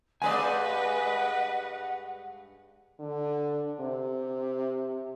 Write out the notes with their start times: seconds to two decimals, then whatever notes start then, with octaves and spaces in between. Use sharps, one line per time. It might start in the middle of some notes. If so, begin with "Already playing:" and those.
0.22 G2 G#3 B4 D5 D#5 F#5 G#5
3.00 D3
3.80 C3